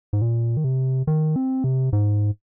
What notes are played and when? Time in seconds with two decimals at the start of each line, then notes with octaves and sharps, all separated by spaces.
0.13 G#2
0.22 A#2
0.57 D#3
0.64 C3
1.07 D#3
1.36 C4
1.64 C3
1.93 G#2